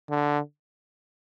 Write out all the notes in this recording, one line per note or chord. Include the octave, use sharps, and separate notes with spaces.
D3